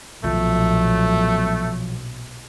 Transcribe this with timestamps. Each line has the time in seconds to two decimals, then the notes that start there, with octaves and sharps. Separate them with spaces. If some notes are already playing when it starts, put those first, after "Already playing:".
0.24 B1 A#2 F3 F#3 A3